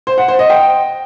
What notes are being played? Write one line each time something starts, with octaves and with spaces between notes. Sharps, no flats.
C5
F#5
C5
D#5
G5